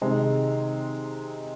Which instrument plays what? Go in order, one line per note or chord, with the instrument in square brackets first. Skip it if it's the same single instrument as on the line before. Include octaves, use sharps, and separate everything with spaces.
[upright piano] C3 D#3 G#3 C4 D#4